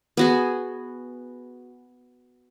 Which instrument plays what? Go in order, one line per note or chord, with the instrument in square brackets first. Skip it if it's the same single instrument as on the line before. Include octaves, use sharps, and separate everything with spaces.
[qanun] B3 F#4 G#4